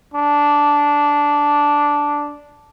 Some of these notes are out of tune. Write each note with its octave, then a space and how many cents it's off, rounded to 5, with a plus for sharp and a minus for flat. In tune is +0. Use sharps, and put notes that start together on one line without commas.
D4 -10